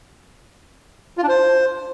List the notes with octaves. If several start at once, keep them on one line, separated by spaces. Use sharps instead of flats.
F4
D4
C5